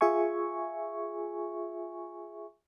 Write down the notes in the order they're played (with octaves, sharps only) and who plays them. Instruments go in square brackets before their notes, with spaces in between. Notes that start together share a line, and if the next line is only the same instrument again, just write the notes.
[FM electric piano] F4 G#4 E5 G#5 C#6